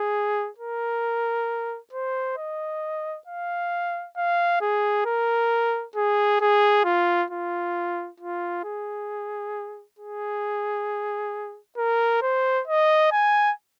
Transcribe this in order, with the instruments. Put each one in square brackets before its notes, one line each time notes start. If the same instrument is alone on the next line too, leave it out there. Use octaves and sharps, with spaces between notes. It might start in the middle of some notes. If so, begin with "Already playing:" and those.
Already playing: [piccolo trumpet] G#4
A#4
C5
D#5
F5
F5
G#4
A#4
G#4
G#4
F4
F4
F4
G#4
G#4
A#4
C5
D#5
G#5